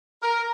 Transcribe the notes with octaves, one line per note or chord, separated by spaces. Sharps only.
A#4